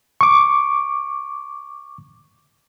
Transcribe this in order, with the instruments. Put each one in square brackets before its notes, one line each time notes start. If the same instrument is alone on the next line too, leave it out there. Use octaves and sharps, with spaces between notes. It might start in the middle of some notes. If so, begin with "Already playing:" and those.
[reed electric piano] C#6 D6